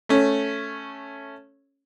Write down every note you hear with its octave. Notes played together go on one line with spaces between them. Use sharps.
A3 C#4